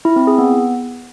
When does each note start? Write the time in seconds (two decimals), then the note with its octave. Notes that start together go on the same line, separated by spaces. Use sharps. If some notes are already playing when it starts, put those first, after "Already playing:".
0.05 E4
0.16 C4
0.27 G#4
0.38 B3